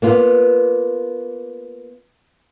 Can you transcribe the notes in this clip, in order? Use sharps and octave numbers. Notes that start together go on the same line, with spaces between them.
A#3 B3 F4